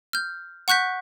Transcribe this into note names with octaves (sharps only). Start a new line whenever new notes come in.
F6 G6
F#5 C#6 F#6 G6 B6